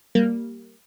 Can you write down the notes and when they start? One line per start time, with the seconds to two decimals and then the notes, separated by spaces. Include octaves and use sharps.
0.15 G3 A#3